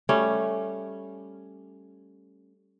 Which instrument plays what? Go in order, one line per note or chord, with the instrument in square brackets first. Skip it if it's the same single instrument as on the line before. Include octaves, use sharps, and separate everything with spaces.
[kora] G3 A3 C#4